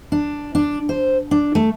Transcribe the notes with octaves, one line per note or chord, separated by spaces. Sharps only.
D4
D4
C5
D4
A3